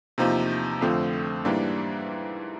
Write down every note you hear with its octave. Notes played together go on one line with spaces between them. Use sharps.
E2 C3 F3 A#3 D#4
F2 D3 F3 A3 C4
G#2 E3 G3 A#3 D4